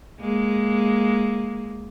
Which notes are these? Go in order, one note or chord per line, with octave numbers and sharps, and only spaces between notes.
G#3 A#3